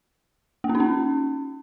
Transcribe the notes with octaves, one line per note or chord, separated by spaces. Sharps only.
A#3
C#4
D#4
C#4